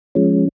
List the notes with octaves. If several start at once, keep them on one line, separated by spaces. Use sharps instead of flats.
F3 G#3 C#4